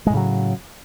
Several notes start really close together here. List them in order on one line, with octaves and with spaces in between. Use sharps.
G#3 A2 C#3 F#3